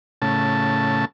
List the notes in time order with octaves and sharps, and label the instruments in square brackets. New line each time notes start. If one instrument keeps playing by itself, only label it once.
[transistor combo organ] A2 C#3 A5